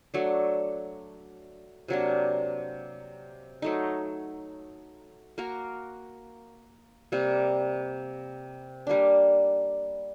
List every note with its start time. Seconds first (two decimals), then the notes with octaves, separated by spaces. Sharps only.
0.14 F#3 A3 D4
1.88 C3 F#3 A#3 D4
3.62 F#3 A3 D#4
5.38 A#3 F#4 A#4
7.12 C3 G3 A#3
8.87 G3 A#3 D4